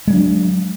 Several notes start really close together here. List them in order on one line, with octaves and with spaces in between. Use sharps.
G#3 F#3 D4